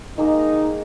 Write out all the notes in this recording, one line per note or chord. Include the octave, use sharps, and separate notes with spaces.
D#3 G#3 A#3 D#4